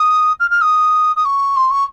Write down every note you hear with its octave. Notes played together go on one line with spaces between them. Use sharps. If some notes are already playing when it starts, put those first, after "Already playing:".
Already playing: D#6
F6
F6
D#6
D#6
C#6
C6
C#6